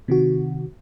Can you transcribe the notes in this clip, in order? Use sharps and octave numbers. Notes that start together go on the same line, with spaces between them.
C3 D#3 F#4